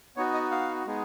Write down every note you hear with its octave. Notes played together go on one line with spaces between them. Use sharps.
B3 D#4 F#4 C#5
D#5
F5
G#3 B3 D#4 G#4